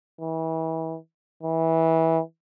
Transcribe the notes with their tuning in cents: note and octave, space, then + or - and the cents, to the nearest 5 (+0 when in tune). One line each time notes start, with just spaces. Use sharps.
E3 -30
E3 -20